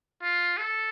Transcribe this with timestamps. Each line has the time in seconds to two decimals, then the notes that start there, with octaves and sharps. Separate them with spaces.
0.22 F4
0.58 A4